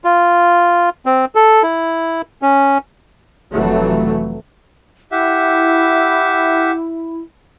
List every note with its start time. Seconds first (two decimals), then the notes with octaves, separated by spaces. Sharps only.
0.04 F4
1.06 C4
1.35 A4
1.63 E4
2.42 C#4
3.52 F1 E3 F#3 A3
5.12 E4 G4 E5 F#5